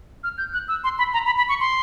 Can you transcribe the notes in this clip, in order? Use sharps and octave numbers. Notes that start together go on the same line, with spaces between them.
F6
G6
F#6
E6
C6
B5
A#5
B5
B5
C#6
C6